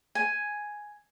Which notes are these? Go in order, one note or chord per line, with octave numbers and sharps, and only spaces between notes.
G#5